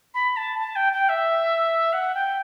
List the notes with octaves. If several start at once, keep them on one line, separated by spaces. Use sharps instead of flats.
B5
A5
A5
G5
G5
E5
F#5
G5